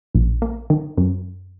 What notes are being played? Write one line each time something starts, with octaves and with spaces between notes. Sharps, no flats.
A#1
A#3
D#3
F#2